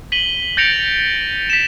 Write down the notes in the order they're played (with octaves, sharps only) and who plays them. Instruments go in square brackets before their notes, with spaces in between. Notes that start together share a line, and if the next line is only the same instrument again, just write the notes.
[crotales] B6 D#7 F#7 G7
G6 A6 A#6 C#7 D7 F7
B6 E7